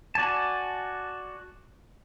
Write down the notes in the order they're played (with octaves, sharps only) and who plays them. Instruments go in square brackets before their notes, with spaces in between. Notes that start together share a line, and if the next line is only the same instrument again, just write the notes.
[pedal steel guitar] F#4 D5 G#5 A5